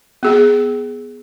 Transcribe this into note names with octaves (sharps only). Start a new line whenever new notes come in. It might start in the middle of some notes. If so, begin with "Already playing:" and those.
B3 G#4